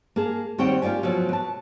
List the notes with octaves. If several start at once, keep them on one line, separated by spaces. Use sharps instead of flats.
A#3 G#4 A5
D#2 G3 C4 C#5 F#5 G5
A#3 F4 G4 D5 G#5
B2 F3 F#3
B2 A5